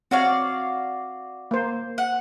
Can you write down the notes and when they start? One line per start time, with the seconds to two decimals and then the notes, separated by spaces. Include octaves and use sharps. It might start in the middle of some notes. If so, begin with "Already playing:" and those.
0.11 C4 F#4 C#5 D5 F5
1.51 A#3 C5
1.98 F#5